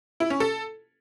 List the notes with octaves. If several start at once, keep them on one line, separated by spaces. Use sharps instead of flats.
E4
C#4
A4